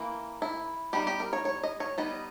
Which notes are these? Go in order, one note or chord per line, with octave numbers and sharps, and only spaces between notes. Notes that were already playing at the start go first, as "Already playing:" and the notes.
Already playing: E3 A#3
E4
G3 B3 D#4 G4
G4
A#4
C#5
C#5
D#5
C#5
G3 B3 D#4 D#5